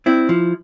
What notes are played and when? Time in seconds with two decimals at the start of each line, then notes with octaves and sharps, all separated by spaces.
0.06 C4 E4
0.29 F3